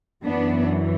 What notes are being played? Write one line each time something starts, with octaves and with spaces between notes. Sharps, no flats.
F#2 E3 B3 D4